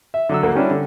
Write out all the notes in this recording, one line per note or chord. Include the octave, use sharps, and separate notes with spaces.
E5
D3 F#3 E6
D2 A#3
G3 C#4 D4 E4
D3